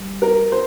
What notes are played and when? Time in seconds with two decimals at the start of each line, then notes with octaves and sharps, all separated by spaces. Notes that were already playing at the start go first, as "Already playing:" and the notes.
Already playing: G3
0.22 A#4
0.52 C5